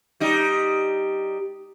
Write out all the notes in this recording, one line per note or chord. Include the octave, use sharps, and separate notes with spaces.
G3 D#4